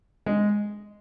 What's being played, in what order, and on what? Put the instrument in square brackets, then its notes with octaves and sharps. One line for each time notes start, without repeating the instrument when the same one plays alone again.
[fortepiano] G#3